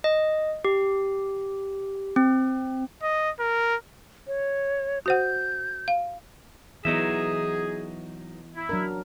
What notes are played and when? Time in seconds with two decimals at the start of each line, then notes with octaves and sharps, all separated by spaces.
0.04 D#5
0.65 G4
2.16 C4
3.03 D#5
3.40 A#4
4.27 C#5
5.06 F#4 C5 F#5 G6
5.88 F5
6.85 E3 F#3 B3 D#4 G#4 D#5 E5
8.56 E4
8.69 F#3 D4 A#4